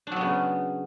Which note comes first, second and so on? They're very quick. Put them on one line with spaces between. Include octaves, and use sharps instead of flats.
D4 F#3 B3 C#3